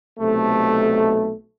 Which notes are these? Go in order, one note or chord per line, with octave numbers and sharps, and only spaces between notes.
B1 C3 A3